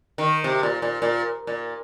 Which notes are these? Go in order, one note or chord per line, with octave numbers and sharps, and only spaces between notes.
D#3
C3
A#2
A#2
A#2
A#2